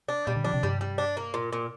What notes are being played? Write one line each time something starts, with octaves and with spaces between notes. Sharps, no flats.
D4
A#2 G3
D3
F3 D4
C3
G2 G3
G3
D4
A#3
A#2
A#2